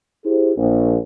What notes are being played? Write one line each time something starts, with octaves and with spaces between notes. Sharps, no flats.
E4 G4 G#4 C5
A#1